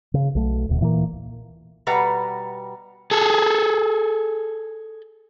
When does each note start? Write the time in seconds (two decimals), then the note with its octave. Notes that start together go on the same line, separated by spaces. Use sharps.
0.14 C#3
0.35 B1 F#3 A3
0.69 D#1 D2 B2
0.81 A#2 E3 G3 A#3
1.87 B2 G3 B4 F#5 A#5
3.11 G#4 A4